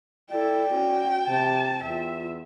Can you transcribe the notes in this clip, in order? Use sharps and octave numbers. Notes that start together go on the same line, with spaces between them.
E4 A4 D5 G5
C#4 F#4
C3 A5
E2 F4 E5